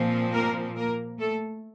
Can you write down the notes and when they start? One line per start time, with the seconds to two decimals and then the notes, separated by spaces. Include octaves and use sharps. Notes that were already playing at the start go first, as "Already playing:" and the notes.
Already playing: A#2 F3 C4
0.34 A#3 A#4
0.76 A#3 A#4
1.19 A3 A4